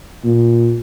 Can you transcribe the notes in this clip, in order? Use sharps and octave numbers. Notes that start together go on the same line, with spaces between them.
A#2